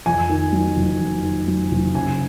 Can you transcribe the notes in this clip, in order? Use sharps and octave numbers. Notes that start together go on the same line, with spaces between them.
F2 G#5
D#3
F#3
F#1
F2
D#3
F#3
F#1
C#3 G#5